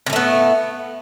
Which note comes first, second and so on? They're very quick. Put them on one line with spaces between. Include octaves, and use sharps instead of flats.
C3 A2 A3 B3